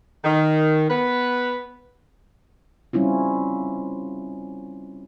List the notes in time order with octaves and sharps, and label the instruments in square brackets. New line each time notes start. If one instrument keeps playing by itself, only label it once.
[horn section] D#3
B3 B4
[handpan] G3 C4 C#4 E4 F4